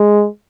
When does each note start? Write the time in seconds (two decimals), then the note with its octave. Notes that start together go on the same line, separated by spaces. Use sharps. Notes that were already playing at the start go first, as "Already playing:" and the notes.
Already playing: G#3